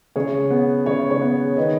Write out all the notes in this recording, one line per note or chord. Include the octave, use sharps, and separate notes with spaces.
C#3 G#4 C#5
B3
C#3 G#4 C#5
G#4 C#5
B3
D#3 B4 D#5